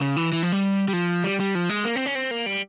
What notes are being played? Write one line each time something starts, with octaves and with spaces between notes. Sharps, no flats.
C#3
E3
E3
F3
G3
G3
F3
G3
G3
F3
G#3
A#3
C4
C#4
C4
A#3
G3